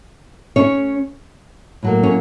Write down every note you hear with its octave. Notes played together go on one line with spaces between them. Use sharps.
C#4 C#5
A2 F#3 A#3
C#4 C#5